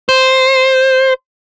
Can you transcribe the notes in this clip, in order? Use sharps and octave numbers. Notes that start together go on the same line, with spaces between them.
C5